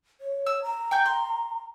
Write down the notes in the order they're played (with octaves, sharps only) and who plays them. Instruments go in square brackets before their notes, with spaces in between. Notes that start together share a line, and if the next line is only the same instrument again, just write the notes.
[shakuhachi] C#5
[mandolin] E6
[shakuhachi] A#5
[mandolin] G5 C#6 G6
C6